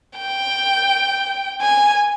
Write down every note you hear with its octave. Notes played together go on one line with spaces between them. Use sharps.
G5
G#5